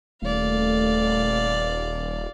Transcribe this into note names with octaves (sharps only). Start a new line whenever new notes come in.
D#1 A3 D5 F5